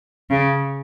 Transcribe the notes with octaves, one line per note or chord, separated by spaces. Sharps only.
C#3